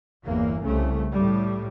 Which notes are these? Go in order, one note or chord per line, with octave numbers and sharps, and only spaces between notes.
G1 E2 A#3
C2 C#3 A3
A2 G3